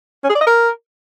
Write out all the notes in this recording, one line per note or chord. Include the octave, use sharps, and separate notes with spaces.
C#4
G#4
D5
D#5
A#4